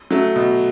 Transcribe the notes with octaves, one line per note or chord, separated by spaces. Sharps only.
F#3 A3
B2